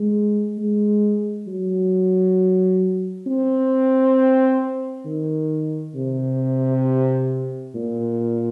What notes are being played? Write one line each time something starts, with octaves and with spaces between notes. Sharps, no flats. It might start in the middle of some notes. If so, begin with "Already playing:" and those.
Already playing: G#3
G#3
F#3
C4
D#3
C3
A#2